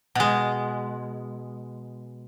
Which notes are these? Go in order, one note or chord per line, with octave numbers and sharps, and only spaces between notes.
B2 G#3